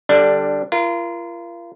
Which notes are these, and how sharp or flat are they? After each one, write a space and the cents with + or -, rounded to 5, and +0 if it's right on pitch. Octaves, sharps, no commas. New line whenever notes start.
D3 +15 G3 +0 D4 +0
F4 -35 A#4 +20